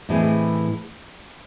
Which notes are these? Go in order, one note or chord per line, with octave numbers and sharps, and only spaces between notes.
A2 E3 G#3 C4